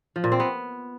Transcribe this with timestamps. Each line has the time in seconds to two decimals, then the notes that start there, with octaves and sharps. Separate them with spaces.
0.16 F3
0.24 A#2
0.32 C4
0.40 B3